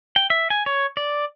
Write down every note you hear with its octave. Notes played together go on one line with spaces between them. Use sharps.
G5
E5
G#5
C#5
D5